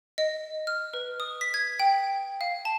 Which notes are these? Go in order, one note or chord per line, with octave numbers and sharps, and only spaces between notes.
D#5
F6
B4
D#6
B6
G#6
G5
F5
A5